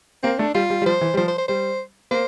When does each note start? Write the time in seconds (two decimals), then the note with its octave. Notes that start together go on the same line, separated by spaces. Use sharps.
0.23 A#3 C4
0.39 A3 D4
0.55 G3 F4
0.70 G3
0.82 G3
0.86 F3 C5
1.01 E3
1.14 G3
1.18 F3 C5
1.28 C5
1.38 C5
1.48 G3 C5
2.11 A#3 C5